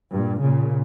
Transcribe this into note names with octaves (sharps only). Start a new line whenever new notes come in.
G2 A#2
A#2 C#3